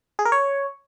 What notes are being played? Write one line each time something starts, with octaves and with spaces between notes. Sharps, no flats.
G#4
A#4
C#5